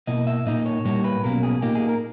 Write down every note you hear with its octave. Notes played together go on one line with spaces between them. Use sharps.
B2 A#3 E4 D#5
E5
A#2 A#3 D#4 D#5
C#5
A#2 G3 A#3 E4 C#5
B4
B1 B2 A#3 C#4 A#4
G#4
A#2 A#3 D#4 G4
G#4
A#4